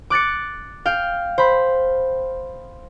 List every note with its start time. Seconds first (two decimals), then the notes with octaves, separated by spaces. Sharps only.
0.10 D6 F#6 A6 C#7
0.85 F5 G5
1.38 C5 B5